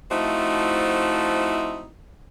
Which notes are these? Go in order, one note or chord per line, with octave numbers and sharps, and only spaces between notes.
F3 A3 C4 D#4 E4 F#4